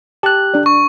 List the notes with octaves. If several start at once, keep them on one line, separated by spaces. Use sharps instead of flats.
G4 A5 F#6
D4 D5
C#6